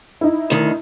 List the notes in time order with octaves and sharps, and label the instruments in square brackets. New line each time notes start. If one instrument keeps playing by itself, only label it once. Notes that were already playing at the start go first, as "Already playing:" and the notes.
[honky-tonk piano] D#4 E4
[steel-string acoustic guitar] D2 D#3